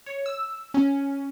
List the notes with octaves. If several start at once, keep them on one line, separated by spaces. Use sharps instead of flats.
C#5
E6
C#4